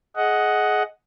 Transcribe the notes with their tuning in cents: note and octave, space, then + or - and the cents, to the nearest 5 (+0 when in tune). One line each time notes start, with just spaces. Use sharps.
G#4 +25 D#5 +10 F#5 +0